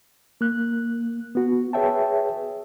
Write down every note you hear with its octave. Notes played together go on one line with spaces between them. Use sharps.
A#3 F#6
B3 F#4
G#4 B4 C#5 E5 G5 A5